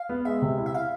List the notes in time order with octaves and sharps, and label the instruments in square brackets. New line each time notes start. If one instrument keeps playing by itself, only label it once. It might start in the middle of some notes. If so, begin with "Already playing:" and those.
Already playing: [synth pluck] F5
[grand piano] B3
[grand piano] G#3 [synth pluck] E5
[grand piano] C3
E4
[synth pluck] E5
[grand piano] E4 [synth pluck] F5